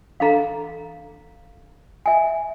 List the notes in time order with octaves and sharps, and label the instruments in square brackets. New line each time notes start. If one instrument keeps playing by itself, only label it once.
[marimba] E3 D4 A4 [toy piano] F5 A#5
[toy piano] E5 G#5